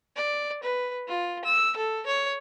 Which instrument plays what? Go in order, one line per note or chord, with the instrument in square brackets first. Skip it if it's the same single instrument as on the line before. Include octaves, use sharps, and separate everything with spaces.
[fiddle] D5
B4
F4
E6
A4
C#5